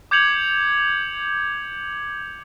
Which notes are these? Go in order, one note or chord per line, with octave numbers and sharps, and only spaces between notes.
D6 G6 G#6 C#7 F7 F#7